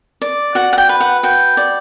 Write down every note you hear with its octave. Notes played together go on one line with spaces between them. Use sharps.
D5
F#4 F#5
F#5
G5
B4
F#5
F#4 G5
D5